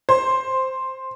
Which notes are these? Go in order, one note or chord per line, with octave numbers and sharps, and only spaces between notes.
C5